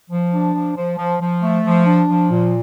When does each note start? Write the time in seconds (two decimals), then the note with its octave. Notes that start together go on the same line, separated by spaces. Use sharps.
0.10 F3
0.32 D4
0.54 F3
0.76 F3
0.98 F3
1.20 F3
1.42 A3
1.65 F3
1.86 D4
2.08 F3
2.30 A#2